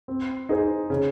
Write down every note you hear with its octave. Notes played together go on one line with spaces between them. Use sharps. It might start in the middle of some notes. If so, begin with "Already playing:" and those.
C4
D#4 G#4 C5
C#3